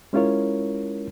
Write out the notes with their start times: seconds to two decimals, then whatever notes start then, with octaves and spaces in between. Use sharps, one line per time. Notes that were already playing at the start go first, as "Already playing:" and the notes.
0.13 G#3 C#4 E4 F4 A#4 C#5